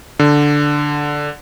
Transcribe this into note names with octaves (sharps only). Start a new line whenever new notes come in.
D3